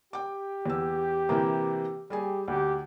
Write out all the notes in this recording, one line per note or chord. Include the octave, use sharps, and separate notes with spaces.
G4 G5 D6
E2 E6
C3 E3 A#3
G3 G4 G#4 G#5
D2 G4